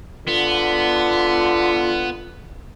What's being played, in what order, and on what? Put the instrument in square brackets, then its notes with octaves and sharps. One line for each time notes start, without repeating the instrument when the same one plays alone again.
[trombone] D3 [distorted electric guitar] B3 [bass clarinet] F4